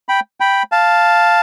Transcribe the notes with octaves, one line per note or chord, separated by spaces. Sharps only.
G5 B5
G5 B5
F5 A5